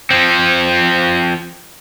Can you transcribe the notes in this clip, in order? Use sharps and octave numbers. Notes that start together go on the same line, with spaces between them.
F3 C4